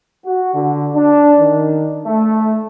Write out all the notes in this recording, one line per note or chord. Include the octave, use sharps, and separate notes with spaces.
F#4
D3
D4
D#3
A3